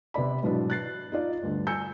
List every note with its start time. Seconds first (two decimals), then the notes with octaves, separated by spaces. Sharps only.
0.14 C3 B3 D5 B5
0.43 G#2 B2 E3 F#3 B3 D4
0.70 F#6 A6 C7
1.12 D#4 F4 D5
1.43 D2 G2 D3
1.67 G#5 E6 G6 C#7